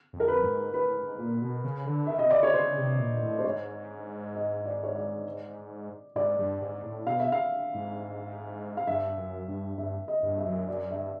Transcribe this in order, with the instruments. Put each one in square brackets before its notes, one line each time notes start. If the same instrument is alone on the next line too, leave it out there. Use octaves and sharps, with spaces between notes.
[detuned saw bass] F2
[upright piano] A#4
B4
[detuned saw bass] G#2
[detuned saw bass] A2 [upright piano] B4
[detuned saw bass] G#2
A#2
B2
C#3
D3
[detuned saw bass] D#3 [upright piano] E5
[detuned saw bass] B2 [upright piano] D#5
[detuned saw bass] C3
[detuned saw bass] C#3 [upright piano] D5
[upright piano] C#5
[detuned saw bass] C#3 [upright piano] C5
[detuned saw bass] C3
A#2
A2
[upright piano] C5
[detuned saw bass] G#2 [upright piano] C#5
[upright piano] D#5
D5
C#5
D5
[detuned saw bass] G#2 [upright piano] D5
[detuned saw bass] G2
G#2
A2
[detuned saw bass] B2 [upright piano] F5
[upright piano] E5
F5
[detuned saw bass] G#2
[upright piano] F5
[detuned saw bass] G2 [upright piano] E5
[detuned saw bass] F#2
G2
[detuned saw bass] G2 [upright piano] E5
[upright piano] D#5
[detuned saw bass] G2
[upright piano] E5
[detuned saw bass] F#2
[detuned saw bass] F#2 [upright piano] D5
[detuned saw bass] G2 [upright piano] E5